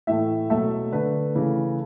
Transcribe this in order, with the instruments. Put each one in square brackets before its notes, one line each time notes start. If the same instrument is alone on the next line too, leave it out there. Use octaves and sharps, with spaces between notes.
[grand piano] A2 E3 A3 E5
B2 F#3 A3 E5
D3 A3 B4
C#3 E3 A3